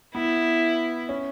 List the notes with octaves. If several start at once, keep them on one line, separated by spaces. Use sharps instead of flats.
B3 E4
C#4